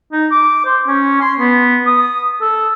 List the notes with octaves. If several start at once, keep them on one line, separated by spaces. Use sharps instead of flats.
D#4
D6
C5
C#4
C6
B3
D#6
A4